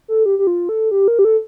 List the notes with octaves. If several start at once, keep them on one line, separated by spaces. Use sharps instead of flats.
A4
G4
G4
F4
A4
G4
A#4
G4
A4